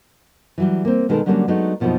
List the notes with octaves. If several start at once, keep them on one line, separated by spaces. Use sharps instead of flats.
E3 F#3 G3
A#3 C4
B2 D#3 G#3 G4 A4 A#4
D3 F#3 G3 A#3 C#4 D4
F#3 G#3 A3 B3 D4 D#4
F#2 B2 F3 A#3 D#4 E4